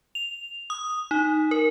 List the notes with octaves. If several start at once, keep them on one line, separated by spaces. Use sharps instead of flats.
F7
D#6
D#4
A#4